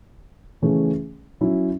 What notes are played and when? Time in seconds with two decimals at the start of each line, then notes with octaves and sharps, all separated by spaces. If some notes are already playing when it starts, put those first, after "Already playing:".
0.62 C#3 E3 A3 C#4 G#4
1.41 F#3 C#4 E4